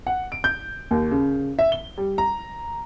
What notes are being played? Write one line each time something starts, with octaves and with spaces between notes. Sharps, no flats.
F#5
D7
G6
D#2
C#3
E5
G7
G3
A#5